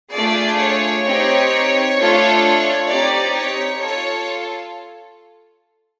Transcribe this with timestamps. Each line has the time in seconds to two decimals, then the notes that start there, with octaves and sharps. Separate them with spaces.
0.14 A3 D4 F4 G#4 D5
0.60 C#5
1.05 C4 D#4 G4
1.97 A3 D4 F4 A4
2.88 C4 D#4 G4 D5
3.34 C#5
3.79 F4 A4 C#5